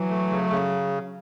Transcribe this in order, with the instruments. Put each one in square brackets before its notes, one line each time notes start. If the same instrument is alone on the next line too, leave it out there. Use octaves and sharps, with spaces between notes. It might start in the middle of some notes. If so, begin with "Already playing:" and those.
Already playing: [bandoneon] E3 [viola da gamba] F#3
[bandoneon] A3
C#3
C#3